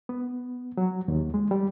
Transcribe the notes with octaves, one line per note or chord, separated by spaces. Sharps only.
B3
F#3
D#2
G#3
G3